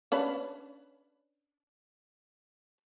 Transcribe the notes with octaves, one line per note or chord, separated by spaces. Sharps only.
C#4 D4 B4